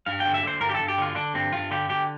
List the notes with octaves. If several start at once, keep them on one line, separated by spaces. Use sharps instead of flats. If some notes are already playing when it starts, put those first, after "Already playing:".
G2 F5
D3 G5
E5
D3 C5
G2 A#4
G4
G2 A4
G4
D3 F4
D3 D4
G2 C4
G2 F4
D3 G4
D3 G4